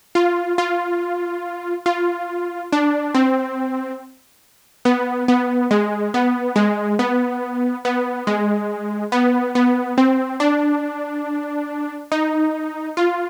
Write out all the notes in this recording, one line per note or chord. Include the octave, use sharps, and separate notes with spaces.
F4
F4
F4
D4
C4
B3
B3
G#3
B3
G#3
B3
B3
G#3
B3
B3
C4
D4
D#4
F4